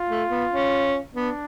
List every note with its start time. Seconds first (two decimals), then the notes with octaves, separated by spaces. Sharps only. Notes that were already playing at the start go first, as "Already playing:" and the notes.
Already playing: F4
0.09 A3
0.30 B3
0.52 C#4
1.14 B3 D4